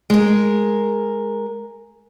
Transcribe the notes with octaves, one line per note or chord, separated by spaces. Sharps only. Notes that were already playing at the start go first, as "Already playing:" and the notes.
G#3 A#4